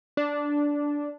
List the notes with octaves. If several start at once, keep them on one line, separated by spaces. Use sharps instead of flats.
D4